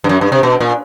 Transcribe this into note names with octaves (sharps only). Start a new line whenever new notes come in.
G2
F#2
G2
C3
B2
A#2